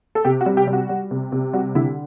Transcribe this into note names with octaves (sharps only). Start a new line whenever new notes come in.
A4
C3 G4
F#4
G3
G4
G3
F#4
G3
C3
C3
G3 F#4
D3 E4